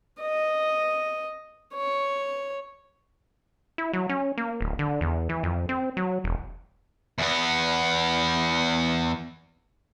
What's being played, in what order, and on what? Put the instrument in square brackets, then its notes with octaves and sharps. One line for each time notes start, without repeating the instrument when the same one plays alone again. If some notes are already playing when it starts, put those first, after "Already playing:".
[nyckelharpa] D#5
C#5
[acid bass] E4
F#3
C#4
A#3
D1
D3
E2
E3
F2
C4
F#3
E1
[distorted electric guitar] E2 B3